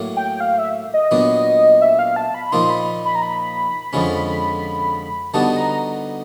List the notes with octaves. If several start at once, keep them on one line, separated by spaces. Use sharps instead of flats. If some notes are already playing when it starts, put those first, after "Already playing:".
Already playing: A2 F#3 A#3
G5
F5
E5
D#5
A#2 F#3 B3 D4
E5
F5
A5
B5
A#2 F3 A#3 D#4 C6
B5
B5
A#5
B5
F2 D3 F3 G#3 C#4
D3 G3 B3 D#4 F#4 A5
A#5